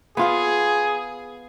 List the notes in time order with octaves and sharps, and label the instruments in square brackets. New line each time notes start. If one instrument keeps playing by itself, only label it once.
[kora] B3 F4 F5 [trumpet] G#4